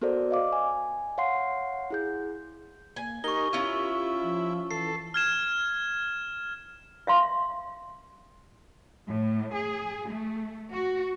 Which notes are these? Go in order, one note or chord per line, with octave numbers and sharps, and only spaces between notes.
B3 F#4 A4 A#4 C5 D5
D#5 F5 D6
G#5
C#5 F5 F#5 C6 C7
E4 G#4 G6
A#3 G#5
D#4 G4 A#4 C#6 G7
C#4 E4 F4
F3
E3 A4 C7
F6 G#6 E7
E5 F5 C6
A2
G#4
A3
F#4